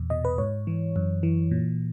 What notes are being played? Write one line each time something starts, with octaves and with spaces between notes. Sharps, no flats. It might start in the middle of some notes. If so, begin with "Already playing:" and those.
Already playing: E2 A#2
B2 D#5
B4
G#2 C#5
E3
F#2
E3
A#2